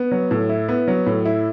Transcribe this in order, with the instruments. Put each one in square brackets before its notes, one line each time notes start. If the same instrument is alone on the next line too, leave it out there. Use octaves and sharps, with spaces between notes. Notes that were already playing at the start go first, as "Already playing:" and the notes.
Already playing: [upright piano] B3
F#3
A2
E4
B3
F#3
A2
E4